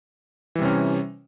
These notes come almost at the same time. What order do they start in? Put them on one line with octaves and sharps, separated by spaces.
E3 G3 C3 C#4